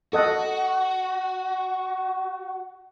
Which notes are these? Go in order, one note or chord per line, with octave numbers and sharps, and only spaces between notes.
F#4 A4 D#5 F#5